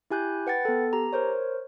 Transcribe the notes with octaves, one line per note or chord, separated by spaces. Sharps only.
E4 G4 G#5 F#6 G6
B4 F#5 G5 A6
B3 A4
G4 A#5
A#4 C5 C#5